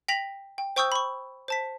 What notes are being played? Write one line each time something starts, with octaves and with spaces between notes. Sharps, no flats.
G5 A#6 B6 F7 F#7
G5
C5 G5 C#6 D#6 E6 G6
B5 C#6
C5 A5 B6